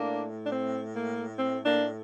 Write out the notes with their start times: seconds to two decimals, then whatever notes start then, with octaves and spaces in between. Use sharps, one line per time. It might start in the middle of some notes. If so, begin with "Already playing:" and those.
Already playing: A2 A3 A#3 D4
0.46 D4
0.52 C4
0.95 A#3
1.38 C4
1.66 A#3 D4